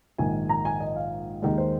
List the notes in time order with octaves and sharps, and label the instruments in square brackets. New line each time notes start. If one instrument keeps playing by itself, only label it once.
[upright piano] A#1 G#2 D#3 G#5
A#5
G#5
D#5
F5
D#2 D#3 G#3 D#5
C5